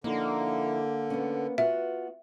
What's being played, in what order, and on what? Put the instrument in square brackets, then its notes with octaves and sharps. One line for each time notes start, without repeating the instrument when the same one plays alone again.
[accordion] D3 [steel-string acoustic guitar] F3 D#4 E4 [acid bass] A#3
[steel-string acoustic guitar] B3 C#4
[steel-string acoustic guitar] B3 F4 F#4 [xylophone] E5